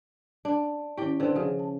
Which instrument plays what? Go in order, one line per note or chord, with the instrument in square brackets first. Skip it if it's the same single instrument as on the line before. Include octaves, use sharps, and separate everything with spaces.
[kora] D4
[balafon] D#3 C#4 E4 [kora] G4 G5
[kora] D3 C4 [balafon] B4 C5
[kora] C#3 [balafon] F3 F#4 G#4
[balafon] A5